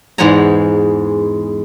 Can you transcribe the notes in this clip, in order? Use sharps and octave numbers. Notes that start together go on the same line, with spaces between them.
E2 G#2 G#3 F#5 G#5 A#5